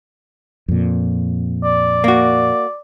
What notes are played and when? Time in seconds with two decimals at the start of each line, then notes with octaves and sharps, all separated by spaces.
0.68 F2 A#2
1.63 D5
2.04 A#3 F#4